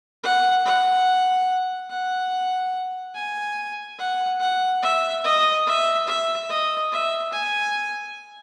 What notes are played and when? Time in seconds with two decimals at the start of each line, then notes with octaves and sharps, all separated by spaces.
0.24 F#5
0.65 F#5
1.90 F#5
3.15 G#5
3.98 F#5
4.40 F#5
4.82 E5
5.24 D#5
5.66 E5
6.07 E5
6.49 D#5
6.92 E5
7.32 G#5